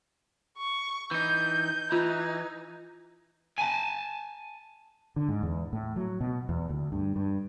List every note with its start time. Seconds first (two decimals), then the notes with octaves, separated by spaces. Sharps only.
0.58 C#6
1.11 E3 D#4 G6
1.92 E3 D#4 F4
3.59 G#5 A5
5.16 D3
5.29 G#2
5.43 E2
5.73 A2
5.96 F#3
6.20 B2
6.49 E2
6.69 D2
6.92 G2
7.16 G2